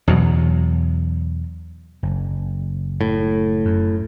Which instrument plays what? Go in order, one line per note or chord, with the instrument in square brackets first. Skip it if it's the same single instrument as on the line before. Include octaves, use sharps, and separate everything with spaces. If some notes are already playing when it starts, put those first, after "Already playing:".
[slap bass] E2 B2 F#3
F#1
[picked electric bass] A2
[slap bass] F#2